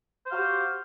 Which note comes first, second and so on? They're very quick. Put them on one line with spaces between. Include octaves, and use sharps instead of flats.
C5 F5 F#4 G4